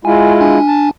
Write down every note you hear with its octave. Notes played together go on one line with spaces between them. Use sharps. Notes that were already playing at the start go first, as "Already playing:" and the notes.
G#3 E4 F4 G#5
D4 G#5
A5